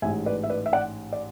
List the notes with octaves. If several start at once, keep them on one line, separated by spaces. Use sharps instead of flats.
A1 G#2 G#3 E5 G#5
B4 D5
E5
B4 D5
E5
D5 F#5
D5